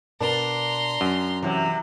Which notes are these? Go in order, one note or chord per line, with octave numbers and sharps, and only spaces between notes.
B2 D4 A#4 C5 A#5 C6
F#2
C3 E3 F#3